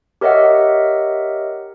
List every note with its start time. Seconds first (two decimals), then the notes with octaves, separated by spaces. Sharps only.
0.21 G4 A#4 C#5 D#5 E5 F#5